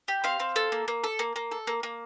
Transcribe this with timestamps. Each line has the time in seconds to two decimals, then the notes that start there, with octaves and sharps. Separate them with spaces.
0.08 G4
0.24 C4 F5
0.40 C4
0.56 A4
0.72 A#3
0.88 A#3
1.04 A4
1.19 A#3
1.36 A#3
1.51 A4
1.67 A#3
1.83 A#3